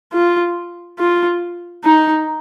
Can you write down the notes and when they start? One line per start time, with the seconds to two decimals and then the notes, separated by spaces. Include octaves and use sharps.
0.13 F4
0.99 F4
1.84 D#4